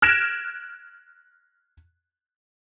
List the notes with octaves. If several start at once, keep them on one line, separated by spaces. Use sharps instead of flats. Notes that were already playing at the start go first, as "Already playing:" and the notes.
F6 F#6 G#6 A#6 D7 E7